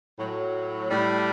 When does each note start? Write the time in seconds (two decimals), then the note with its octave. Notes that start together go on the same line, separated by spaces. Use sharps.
0.18 A2 F#3
0.90 A2 G3